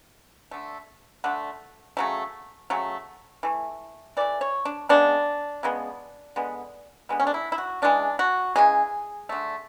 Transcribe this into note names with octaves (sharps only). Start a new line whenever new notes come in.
D3 A3
D3 A3 F#5
C#3 F#3 A3
C#3 F#3 A3
E3 A3
E3 A3 D5
C#5
D4
C#3 G#3 B3 D4
C#3 G#3 B3
D3 G#3 B3
D3 G#3 B3
C#4
D4
E4
E4
F#4
C#3 E3 G#3 D4
F#4
C#3 E3 G#3 G#4
D3 A3